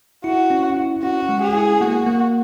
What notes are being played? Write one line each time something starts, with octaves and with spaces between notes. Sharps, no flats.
E4 F#4
C#4
E4
C#4 F#4
G#3
G#4
E4
A#3 F#4
A#3